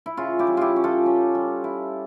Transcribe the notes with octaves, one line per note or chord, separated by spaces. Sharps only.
E4
C#3 F4
E4 G4
G3
E4 F4 G4
C#4
F4 A4
C#4
G3
E4